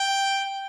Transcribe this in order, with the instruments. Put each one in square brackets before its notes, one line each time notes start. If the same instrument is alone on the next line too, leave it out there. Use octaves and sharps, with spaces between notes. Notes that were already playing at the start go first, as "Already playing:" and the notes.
Already playing: [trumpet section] G5